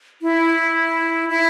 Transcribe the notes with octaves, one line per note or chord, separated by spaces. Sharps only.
E4
E4